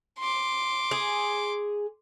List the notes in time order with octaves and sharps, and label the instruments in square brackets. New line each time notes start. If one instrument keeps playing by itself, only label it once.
[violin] C6 D6
[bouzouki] G#4